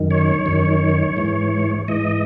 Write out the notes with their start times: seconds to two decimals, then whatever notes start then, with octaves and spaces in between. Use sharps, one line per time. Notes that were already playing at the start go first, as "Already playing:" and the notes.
Already playing: F#2 D#3
0.11 C#5
0.46 F#2 D#3
1.17 G#2 E3
1.88 G#2 E3 D#5